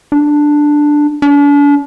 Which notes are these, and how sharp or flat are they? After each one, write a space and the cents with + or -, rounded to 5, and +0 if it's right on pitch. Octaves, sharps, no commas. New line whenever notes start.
D4 +5
D4 -40